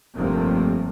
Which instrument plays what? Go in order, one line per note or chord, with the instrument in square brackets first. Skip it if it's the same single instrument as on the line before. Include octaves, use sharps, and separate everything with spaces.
[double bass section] F1 G2 C3 A3 A#3